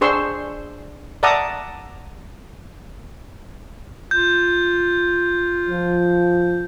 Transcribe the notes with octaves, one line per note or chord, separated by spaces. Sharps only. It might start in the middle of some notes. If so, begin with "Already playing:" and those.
D4 G#4 C5 C6 C#6 E6
D5 E5 F#5 A5 A#5 D#6
F4 G6
F3